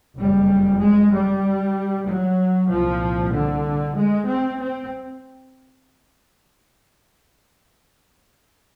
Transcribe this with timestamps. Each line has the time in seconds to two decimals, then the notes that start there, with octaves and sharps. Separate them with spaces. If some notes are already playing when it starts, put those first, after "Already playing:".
0.16 F#1 F2 C#3 G3
0.80 G#3
1.11 G3
2.06 F#3
2.68 C2 A#2 F3
3.32 D3
3.96 G#3
4.28 C4
4.58 C4